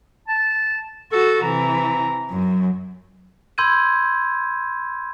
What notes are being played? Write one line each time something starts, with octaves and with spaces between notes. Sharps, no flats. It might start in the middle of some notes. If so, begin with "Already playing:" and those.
A5
F#4 A4
C3 E3 A#5
F#2
B5 C6 E6 G6 G#6 D#7